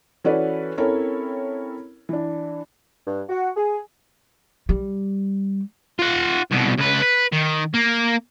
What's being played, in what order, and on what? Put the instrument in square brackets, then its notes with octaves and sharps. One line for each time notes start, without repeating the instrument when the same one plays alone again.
[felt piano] E3 C#4 F#4 A4 B4 D5
C4 C#4 E4 A4 A#4 C#5
E3 D4
[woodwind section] G2
F#4
G#4
[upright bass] G3
[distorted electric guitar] F4 F#5
C2 B2
C#2 B4
B4
D#3
A#3